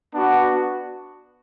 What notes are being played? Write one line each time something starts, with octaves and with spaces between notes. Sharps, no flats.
B3 D4 F#4